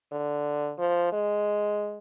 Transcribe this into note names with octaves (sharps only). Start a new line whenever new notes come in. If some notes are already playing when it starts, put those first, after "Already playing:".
D3
F3
G#3